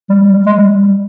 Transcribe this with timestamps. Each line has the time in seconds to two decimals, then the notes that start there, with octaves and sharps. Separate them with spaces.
0.10 G3
0.22 G3
0.34 G3
0.46 G#3
0.57 G3
0.70 G3
0.82 G3